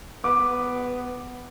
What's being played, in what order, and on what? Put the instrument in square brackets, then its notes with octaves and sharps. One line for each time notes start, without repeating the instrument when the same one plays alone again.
[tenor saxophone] B3 [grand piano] D6